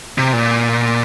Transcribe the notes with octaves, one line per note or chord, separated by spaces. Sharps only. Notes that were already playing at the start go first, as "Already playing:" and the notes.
C3
A#2